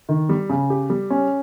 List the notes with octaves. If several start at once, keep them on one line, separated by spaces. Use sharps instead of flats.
D#3
G3
C#3
G4
G3
C#4